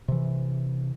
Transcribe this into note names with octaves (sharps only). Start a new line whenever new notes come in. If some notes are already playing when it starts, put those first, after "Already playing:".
C3 E3